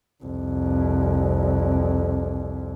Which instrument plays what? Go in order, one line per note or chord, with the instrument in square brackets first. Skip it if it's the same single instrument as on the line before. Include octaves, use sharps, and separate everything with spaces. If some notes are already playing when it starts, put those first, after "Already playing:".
[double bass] C2 F2